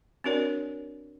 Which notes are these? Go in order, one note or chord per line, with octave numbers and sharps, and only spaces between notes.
C4 D4 F#4 A#4 C#5 D5